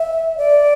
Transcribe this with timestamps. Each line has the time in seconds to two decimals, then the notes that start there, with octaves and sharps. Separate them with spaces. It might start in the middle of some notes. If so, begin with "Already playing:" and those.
Already playing: E5
0.38 D5